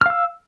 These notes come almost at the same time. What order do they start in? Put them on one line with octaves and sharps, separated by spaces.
F6 F5 E6